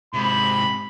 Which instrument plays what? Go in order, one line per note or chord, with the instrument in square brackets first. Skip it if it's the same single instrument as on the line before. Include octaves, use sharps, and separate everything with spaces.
[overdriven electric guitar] G#2 C3 [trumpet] B5